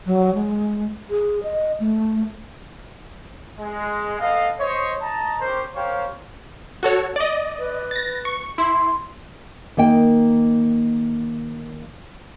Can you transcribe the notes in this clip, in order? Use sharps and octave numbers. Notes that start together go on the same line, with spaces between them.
F#3
G#3
G#4
D#5
A3
G#3
B3 A4 D#5 F5
C5 C#5 D#5
D#5 A5 A#5
C#4 G4 A#4 C5
G4 A#4 C5 C#5 F5 G5
F#4 A4 C#5
D5 D#5
B4
A6 A#6
C#6
E4 C6
D#3 A#3 D#5 G5